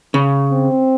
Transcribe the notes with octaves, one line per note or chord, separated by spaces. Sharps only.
C#3
C4